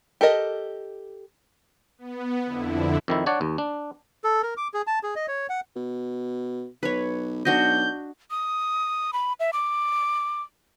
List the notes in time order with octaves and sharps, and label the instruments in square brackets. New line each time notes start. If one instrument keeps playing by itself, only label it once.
[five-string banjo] G4 A4 A#4 D#5
[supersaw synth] B3
F2 D3 E4
[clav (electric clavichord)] F2 D#3 E4
D4 C#5 D5 F#5
D#2
D4
[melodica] A4
A#4
D6
G#4
A5
G#4
D#5
C#5
F#5
[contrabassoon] B2
[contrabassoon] B1 [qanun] B4 C#5
[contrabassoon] B1 [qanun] D4 F#4 D#5 [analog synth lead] G6
[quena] D#6
B5
E5
D6